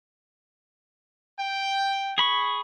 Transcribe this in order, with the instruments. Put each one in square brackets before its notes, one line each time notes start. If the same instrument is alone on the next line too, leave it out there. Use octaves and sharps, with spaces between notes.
[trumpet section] G5
[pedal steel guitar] G#4 B5 C#6